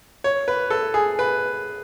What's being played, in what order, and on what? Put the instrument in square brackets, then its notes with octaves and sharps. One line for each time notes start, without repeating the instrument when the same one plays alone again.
[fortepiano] C#5
B4
A4
G#4
B4